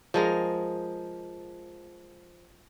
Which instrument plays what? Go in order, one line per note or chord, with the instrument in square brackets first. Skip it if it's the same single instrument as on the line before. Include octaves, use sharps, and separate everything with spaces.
[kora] F3 G#3 A#4